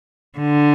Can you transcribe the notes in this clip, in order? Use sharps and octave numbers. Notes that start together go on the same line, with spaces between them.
D3